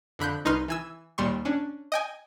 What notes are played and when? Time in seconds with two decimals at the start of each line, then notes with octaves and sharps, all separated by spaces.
0.19 F2 D3 B5 F#6 G6
0.45 C2 D#4 B4 C6 F6
0.68 E3 G#5 E6
1.18 D#2 A#2 G3 C6 C#6
1.45 C#4 D4
1.92 D#5 G5 G#5